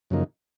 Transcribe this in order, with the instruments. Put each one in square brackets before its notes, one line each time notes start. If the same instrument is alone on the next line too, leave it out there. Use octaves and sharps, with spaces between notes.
[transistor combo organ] F#2 C#3 F3 A#3 D#4